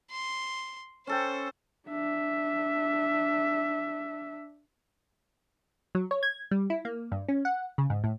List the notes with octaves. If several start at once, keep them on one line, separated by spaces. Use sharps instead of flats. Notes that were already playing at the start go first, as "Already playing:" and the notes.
C6
C#4 A4 C5 G5
D4 E5
F#3
C#5
G#6
G3
E4
A#3
G2
C#4
F#5
C#3
G#2
A2